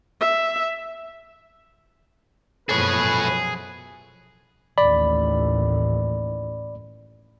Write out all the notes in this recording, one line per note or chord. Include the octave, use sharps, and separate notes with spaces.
E5
F#2 B2 F3 G#4 A4 B4 C#5
A1 D#2 D5 B5